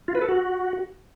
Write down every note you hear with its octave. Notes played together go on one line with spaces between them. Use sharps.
F4
B4
A4
F#4